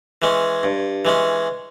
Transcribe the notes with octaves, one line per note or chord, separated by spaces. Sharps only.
E3 G#3 C#4
G2
E3 G#3 C#4